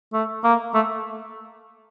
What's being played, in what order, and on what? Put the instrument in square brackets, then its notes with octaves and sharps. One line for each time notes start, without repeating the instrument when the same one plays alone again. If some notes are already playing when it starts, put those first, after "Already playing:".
[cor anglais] A3
A#3
A3